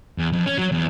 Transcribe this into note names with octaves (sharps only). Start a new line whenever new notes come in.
E2
F2
C#4
F#3
E2